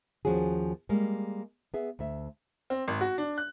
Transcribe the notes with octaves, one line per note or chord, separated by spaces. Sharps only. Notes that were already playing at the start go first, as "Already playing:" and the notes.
D#2 F3 C#4 F#4 G#4
G3 G#3 A#3
B3 G#4 E5
D2 E5
C4
G#1
F#4
D4
F#6